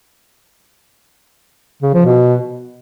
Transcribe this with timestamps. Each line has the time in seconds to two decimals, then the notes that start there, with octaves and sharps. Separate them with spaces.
1.82 C#3
1.94 F3
2.05 B2